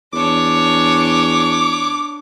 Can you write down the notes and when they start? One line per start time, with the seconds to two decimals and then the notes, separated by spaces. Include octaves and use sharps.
0.13 E2 D4 C#5 D6